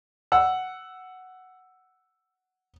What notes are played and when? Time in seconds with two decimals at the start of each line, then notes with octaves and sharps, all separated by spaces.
0.32 F#5 E6